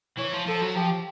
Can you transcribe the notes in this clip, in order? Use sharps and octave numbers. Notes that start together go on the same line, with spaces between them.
E3 C#5
F3
F3 A4
F#3
F3 G4